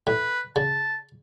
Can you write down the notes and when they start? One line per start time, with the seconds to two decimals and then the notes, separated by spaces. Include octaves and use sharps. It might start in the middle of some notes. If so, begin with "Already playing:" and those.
0.07 A2 B4
0.56 C#3 A5